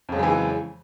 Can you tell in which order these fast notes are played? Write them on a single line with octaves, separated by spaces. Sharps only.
F2 C#3 F#3 G#3 E3